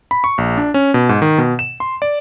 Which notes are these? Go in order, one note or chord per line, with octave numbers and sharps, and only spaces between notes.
B5
C#6
A#1
D4
C#4
B2
G#2
D#3
B2
E7
C6
D5